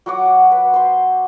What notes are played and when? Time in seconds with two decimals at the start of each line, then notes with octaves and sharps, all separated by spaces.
0.06 F#3 F#4 F#5 D6
0.52 B4
0.74 C5 C6